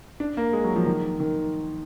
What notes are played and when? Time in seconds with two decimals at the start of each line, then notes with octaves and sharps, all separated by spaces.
0.20 D4
0.37 A#3
0.53 G#3
0.64 F#3
0.76 F3
0.86 D#3
1.20 D#3